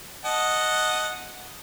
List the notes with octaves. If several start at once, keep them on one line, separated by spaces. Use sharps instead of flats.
D#5 F#5 A5